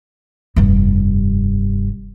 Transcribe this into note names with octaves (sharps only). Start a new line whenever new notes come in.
F1 G2